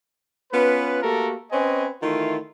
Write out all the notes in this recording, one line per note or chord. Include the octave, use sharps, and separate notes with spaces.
B3 C#4 F4 B4
A3 A#3 F#4 G4 A4 A#4
C4 C#4 B4 C#5 D#5 G#5
D#3 E3 A3 E4 F4